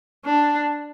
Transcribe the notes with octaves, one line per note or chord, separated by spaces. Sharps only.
D4